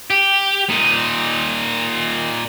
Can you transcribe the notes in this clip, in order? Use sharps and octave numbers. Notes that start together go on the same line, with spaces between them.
G4
A#2 D#4